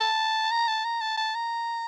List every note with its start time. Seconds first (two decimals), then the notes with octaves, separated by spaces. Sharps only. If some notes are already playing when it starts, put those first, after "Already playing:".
0.01 A5
0.51 A#5
0.68 A5
0.85 A#5
1.01 A5
1.18 A5
1.35 A#5